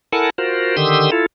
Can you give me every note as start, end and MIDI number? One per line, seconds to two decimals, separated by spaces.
0.12 0.30 64
0.12 0.30 69
0.12 0.30 70
0.12 0.30 78
0.12 0.30 80
0.12 0.30 81
0.38 0.76 65
0.38 0.76 66
0.38 0.76 70
0.38 0.76 72
0.77 1.11 50
0.77 1.11 51
0.77 1.11 67
0.77 1.11 84
0.77 1.11 87
0.77 1.11 88
1.12 1.26 64
1.12 1.26 65
1.12 1.26 69